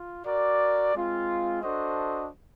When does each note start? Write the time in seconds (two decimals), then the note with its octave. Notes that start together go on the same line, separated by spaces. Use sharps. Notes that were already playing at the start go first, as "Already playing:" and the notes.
Already playing: F4
0.25 F#4 A#4 D5
0.93 G#3 C4 F4
1.61 D4 F#4 A4 C5 D#5